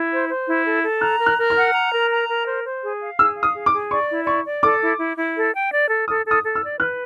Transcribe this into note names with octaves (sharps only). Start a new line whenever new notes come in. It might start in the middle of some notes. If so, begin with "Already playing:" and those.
Already playing: E4
C5
C5
E4
A4
A4
A#5 F#6
A#4
F#6
A#4
F6
F#5
A#5
A#4
A#5
A#4
C5
C5
G#4
F5
G#4 E6
F5
D#6
G#4
D6
G#4
D5 C#6
E4
D5 C#6
D5
A4 D6
E4
E4
E4
A4
G5
D5
A4
A4 D#6
A4
D#6
A4
E6
D5
B4 F#6